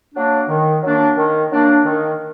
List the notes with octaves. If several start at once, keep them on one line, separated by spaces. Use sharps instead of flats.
F#3 A#3 D4
D#3
F#3 A#3 D4
D#3
F#3 A#3 D4
D#3